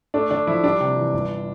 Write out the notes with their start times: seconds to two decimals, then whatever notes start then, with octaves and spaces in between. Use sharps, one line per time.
0.14 A3 D4
0.30 D3 D4
0.47 F3 E4
0.63 G3 D4
0.80 C3
0.97 E3
1.13 G1